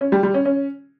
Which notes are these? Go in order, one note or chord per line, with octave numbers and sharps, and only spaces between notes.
C#4
G3
G3
C#4
C#4